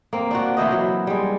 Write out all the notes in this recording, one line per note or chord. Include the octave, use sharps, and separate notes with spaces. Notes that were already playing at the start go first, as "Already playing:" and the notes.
A#3 C4
D4 F4 F#4
E3 E4 C5 D#5
E3 F#3
G3 G#3